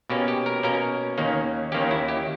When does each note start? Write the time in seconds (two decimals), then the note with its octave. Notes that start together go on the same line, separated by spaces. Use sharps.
0.10 B2 A#3 C#4 G4
0.28 G4
0.46 A#4
0.63 B2 A#3 C#4 A#4
1.18 D#2 D#3 A#3 C#4
1.72 D#2 D#3 A#3 C#4 G4
1.91 E4
2.08 G4